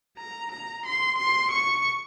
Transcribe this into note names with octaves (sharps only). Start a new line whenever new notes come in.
A#5
A#5
C6
C6
C#6